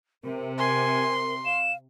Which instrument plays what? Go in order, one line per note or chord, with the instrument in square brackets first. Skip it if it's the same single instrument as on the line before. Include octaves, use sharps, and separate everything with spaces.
[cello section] C3 [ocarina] A#4
[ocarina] A#4 [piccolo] G#5 [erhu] C6
[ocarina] F5 [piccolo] E7